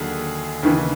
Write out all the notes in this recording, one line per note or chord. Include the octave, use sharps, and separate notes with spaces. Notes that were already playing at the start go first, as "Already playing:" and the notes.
Already playing: D#2 D3 F#3 G#4
D#2 C#3 E3